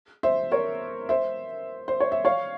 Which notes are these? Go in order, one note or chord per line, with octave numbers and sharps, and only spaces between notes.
C5 E5
A#4 C#5
C5 E5
C5
C#5
E5
C#5 F5